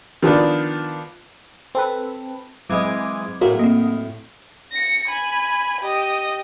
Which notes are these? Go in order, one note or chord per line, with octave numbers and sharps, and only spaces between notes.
D#3 F3 B3 D4
C4 A4 B4
E3 F#3 G#3 C4 B5 D6 G#6
A2 F#3 G#3 A#3 F#4
A#3 C4 D#5
A#6 C#7
G#5 B5
G4 D#5